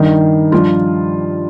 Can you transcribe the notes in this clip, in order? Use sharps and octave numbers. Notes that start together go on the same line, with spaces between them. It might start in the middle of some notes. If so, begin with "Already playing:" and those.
Already playing: G2 D#3
G2 F3 F4